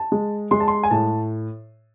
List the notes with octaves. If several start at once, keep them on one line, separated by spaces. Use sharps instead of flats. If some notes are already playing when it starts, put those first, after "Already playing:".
Already playing: A5
G#3
G#3 C6
A5
C6
G#5
A2 A5